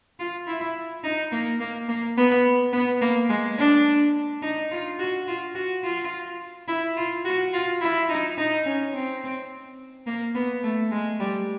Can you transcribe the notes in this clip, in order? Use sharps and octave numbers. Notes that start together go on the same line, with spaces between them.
F4
E4
D#4
A#3
A#3
A#3
B3
B3
A#3
G#3
D4
D#4
F4
F#4
F4
F#4
F4
E4
F4
F#4
F4
E4
D#4
D#4
C#4
C4
A#3
B3
A3
G#3
G3